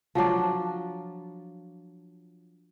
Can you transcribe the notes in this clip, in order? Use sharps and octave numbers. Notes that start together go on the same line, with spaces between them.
F3 F#3 D4 F4